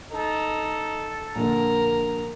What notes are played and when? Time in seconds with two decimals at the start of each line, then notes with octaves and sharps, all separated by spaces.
0.12 D#4 A4
1.35 A#1 D3 A#4